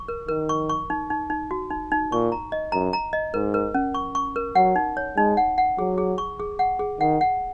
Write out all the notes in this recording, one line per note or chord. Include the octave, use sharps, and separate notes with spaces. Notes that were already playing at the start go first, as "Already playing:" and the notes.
Already playing: C#6
A#4
D#3 A#4
C#6
C#6
D#4
D#4
D#4
F#4
D#4
D#4
A#2 C#6
A#5
D#5
F#2 A#5
A#5
D#5
G#2 A#4
A#4
C#4
C#6
C#6
A#4
F#3 F#5
D#4
C#5
G#3 D#4
F#5
F#5
F#3 G#4
G#4
C#6
G#4
F#5
G#4
D#3 F#5
F#5